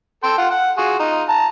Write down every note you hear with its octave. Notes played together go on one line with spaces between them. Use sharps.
A4 G5 C6
F4 F#5
F#5
F4 F#4 G#4
D#4 F4
A5 A#5